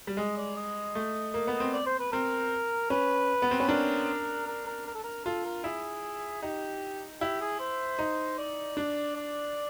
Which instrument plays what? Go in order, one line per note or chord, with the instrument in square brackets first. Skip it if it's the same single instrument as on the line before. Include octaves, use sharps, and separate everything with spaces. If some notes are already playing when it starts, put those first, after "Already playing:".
[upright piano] G3
[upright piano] G#3 [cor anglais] D#5
[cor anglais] D5
D#5
[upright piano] A3
A#3
B3
C4
[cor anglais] D5
C5
B4
[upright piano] C4 [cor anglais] A#4
[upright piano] C#4 [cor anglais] B4
[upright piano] B3
C4
C#4
[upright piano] D4 [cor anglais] A#4
[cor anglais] A#4
A#4
A#4
A4
A#4
[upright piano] F4 [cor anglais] A4
[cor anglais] A#4
[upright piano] E4 [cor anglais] G#4
[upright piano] D#4 [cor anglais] G4
[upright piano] E4 [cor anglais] G4
[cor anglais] G#4
C5
[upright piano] D#4
[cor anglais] D5
[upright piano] D4
[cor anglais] D5